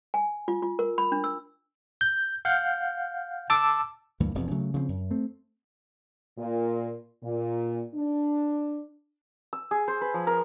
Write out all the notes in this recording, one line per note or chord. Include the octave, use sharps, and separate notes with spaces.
G#5
F4
F4
A#4
B5
D4
E6
G6
F5 F#5 G6
A5 D6 E6
D2 G2 E3 A#3
E1 F2 C3
C#3 F#3 A3
C#3 F3 G#3 C4
F#2
A3 C4
A#2
A#2
D4
E6
G#4
C5
B4
F3
A#4